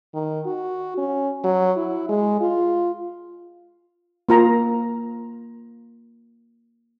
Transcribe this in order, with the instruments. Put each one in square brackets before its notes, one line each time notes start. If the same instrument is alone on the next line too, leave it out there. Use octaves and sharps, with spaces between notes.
[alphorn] D#3
F#4
C#4
F#3
E4
G#3
F4
[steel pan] A#3 F4 A#5